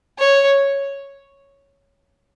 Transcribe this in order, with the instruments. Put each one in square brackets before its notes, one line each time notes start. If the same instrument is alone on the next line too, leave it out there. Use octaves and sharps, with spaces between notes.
[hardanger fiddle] C#5